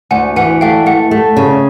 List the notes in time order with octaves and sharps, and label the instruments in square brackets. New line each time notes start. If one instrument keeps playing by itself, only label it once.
[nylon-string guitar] D2 [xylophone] F#5 G#5
[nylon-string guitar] E3 [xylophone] F#5 G#5
[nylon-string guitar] A3 [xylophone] F5 G5
[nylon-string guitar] A3 [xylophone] F#5
[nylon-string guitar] A3
C#3